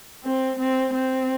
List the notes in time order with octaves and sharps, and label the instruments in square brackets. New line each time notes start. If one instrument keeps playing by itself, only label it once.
[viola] C4
C4
C4